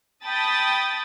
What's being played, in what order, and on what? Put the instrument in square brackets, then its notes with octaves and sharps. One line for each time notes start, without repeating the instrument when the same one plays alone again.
[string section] G5 A5 B5 D#6 A6